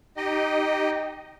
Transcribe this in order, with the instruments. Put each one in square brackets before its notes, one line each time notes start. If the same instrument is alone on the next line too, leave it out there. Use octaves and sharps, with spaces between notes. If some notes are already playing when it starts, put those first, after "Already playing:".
[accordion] D#4 G4 D#5